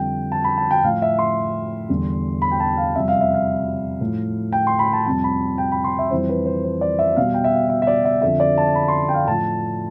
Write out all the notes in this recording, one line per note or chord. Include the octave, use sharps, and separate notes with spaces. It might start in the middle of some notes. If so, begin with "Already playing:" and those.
Already playing: F2 D3 G3 G5
A5
B5
A5
G5
A2 F3 F5
E5
C6
E2 D3 G3
B5
G5
A5
F5
F2 C3 G3 E5
F5
E5
F5
A2 F3
G5
C6
B5
A5
F2 C3 G3 A5
B5
G5
B5
C6
E5
F2 E3 G3 C5
B4
C5
C5
D5
E5
B2 G3 F5
G5
E5
F5
E5
E5
D5
E5
F2 D3 F3 E5
D5
A5
B5
C6
G5
F5
A2 F3 A5